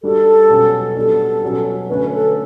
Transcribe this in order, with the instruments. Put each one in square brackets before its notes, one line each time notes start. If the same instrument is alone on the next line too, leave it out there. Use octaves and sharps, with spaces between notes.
[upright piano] G3 D4 F#4 [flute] A4
[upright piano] B2 F#3 C#4 F#4
[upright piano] G3 B3 D4 F#4 [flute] A4
[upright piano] B2 F#3 C#4 F#4
[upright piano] D3 A3 C#4 [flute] B4
[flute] A4